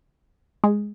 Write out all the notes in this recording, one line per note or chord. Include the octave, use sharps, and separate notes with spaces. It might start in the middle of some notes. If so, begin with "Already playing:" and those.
G#3